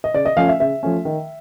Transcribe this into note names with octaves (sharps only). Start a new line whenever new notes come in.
D#5
C#3 D5
D#5
F3 A3 C#4 F5
E5
C#3 E5
F3 A3 C#4
D#3